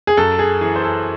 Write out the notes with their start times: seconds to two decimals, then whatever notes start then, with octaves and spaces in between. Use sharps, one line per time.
0.07 G#4
0.17 F#2 A4
0.39 G#4
0.61 E3 G#4
0.76 C5
0.83 A4